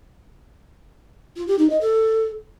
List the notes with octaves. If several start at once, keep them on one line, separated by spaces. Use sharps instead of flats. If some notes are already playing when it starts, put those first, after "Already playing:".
F4
G4
D#4
D#5
A4